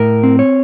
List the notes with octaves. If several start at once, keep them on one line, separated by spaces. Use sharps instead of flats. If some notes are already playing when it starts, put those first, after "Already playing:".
Already playing: A2 A#4
C4
C#5